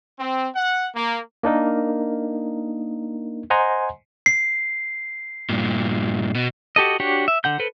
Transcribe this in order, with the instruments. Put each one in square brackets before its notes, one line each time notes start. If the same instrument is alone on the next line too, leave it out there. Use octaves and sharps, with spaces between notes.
[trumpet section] C4
F#5
A#3
[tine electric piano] A#3 D4 D#4 A#4
C5 D#5 F#5 G#5 A#5 C6
[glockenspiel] C7
[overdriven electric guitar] G2 A#2
B2
[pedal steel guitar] F#4 G4 A4 D#5
D4 F#4 G4 C#5
E5
D3 F#5 G6
A4 B4 C5